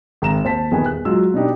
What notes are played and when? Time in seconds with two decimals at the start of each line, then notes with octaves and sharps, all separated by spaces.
0.22 G#1 A#5 E7
0.44 D#2 C5 A5 B6
0.71 D#1 E2 D#3 B3 G#4 G#5
0.86 F#6
1.05 F#3 G#3 F4 E6
1.34 B2 D4 D#4 G4